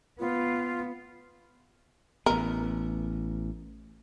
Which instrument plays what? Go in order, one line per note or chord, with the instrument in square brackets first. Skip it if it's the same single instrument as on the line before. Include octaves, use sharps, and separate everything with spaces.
[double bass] B3 [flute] F4
[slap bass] A1 B3 [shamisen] A#4